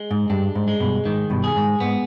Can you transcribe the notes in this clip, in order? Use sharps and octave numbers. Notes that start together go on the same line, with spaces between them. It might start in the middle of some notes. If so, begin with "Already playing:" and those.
Already playing: G#3
G#2
G2 D4
G#2
G#3
G2 B2
G#2 D#3
G2 B2
G#4
G#2
G#2 B3